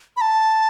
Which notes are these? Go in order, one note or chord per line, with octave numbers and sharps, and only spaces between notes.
B5
A5